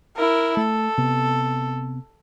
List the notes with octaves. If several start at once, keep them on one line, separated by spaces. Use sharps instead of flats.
E4 A#4
A3 A4
C3 B3